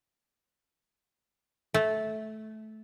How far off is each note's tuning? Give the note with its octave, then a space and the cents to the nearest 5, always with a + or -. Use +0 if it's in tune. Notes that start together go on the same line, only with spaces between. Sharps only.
A3 -15